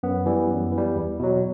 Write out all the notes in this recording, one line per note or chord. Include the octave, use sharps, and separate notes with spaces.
F#2 B3
E3 G3
F#2
E3
G3
E2
B2 F#3